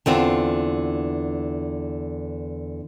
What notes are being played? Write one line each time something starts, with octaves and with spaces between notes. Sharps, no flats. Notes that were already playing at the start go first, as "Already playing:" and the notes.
E2 D3 C4 F4